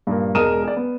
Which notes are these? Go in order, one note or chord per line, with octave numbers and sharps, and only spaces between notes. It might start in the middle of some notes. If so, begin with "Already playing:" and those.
G2 A#2 A#3
E1 G#3 A#4 D#6 D#7 E7
G#4 D5
B3